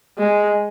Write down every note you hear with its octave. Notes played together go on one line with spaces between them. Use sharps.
G#3